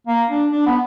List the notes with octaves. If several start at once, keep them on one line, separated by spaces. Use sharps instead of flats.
A#3
D4
D4
B3